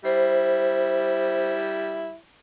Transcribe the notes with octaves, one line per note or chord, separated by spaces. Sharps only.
G3 E4 C5